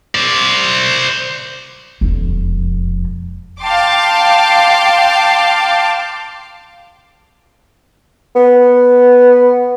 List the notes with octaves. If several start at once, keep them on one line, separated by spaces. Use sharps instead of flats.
C5 D5
E1 F2
F5 G5 A5 C6 D6
B3